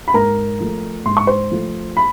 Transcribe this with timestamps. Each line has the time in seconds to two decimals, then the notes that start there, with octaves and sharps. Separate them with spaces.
0.08 B5
0.14 G#2 A#4 A#5
0.60 F3 A3
1.06 G#2 C6
1.17 C#6
1.27 C5 C6
1.51 F3 A3
1.97 B5